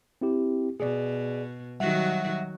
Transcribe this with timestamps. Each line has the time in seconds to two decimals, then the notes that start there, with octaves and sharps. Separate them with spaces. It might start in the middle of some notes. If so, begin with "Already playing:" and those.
0.21 C4 E4 G4
0.80 B2 G#4 D5
1.80 D#3 F#3 G3 F#4 E5 F#5